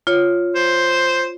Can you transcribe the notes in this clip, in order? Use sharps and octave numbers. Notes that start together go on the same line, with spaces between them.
F4 C#5
C5